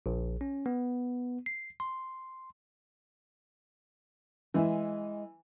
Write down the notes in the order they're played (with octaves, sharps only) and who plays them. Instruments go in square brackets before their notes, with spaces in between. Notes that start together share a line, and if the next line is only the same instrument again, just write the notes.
[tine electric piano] A#1
C#4
B3
C7
C6
[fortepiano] E3 [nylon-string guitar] G#3 E5